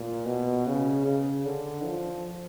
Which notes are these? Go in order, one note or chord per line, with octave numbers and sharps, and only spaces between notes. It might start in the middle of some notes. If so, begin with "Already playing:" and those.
Already playing: A#2
B2
C#3
C#3
D3
F3